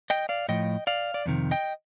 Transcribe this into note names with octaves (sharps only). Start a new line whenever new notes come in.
D#5 G5
D5 F5
A2 F3 D#5 G5
D5 F5
D5
F2 C3 D#3
D#5 G5